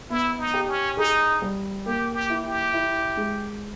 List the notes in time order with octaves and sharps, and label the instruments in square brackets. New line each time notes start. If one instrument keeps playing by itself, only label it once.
[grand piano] B3 [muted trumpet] E4
[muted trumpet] D#4
[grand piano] G4
[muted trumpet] C#4
[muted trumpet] D#4 [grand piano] G#4
[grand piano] G3
[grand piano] A#3 [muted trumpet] G4
[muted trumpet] G4
[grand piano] E4
[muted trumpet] G4
[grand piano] E4
G#3